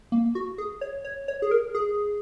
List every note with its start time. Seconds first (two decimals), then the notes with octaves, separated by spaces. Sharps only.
0.12 A#3
0.35 F#4
0.58 G#4
0.81 C#5
1.04 C#5
1.28 C#5
1.42 G#4
1.51 A#4
1.75 G#4